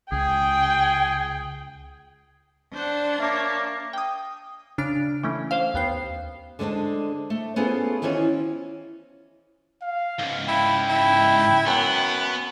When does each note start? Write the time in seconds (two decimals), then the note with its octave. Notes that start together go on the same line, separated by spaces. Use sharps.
0.12 C#2 G#4 G5
2.74 D4 C5 F#5
3.20 A#3 C#5 E5 A5 D6
3.93 G5 D#6
4.78 C#3 D4 F6 D7
5.23 E3 A3 C#4
5.51 C5 F5
5.74 D#2 B3 G5 C7
6.59 D3 G#3 A#3 C4 D4
7.30 A3
7.56 B3 C#4 F4 G#4 A4 C5
8.02 D#3 E3 C4 C#4 F4 F#4
9.82 F5
10.19 C#2 G#2
10.48 E4 G5
10.89 E4
11.66 F#2 B3